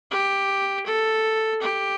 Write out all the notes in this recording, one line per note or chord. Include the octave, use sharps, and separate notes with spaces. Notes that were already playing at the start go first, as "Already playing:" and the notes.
G4
A4
G4